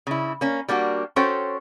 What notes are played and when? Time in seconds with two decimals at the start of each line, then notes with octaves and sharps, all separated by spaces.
0.07 C#3 E4
0.41 A#3 C#4
0.68 G3 A#3 D4 F#4
1.16 C#4 F#4 A4 C5 C#5 G5